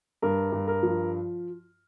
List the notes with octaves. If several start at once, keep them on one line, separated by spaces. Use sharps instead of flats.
G2 A#4
G2
A#4
F3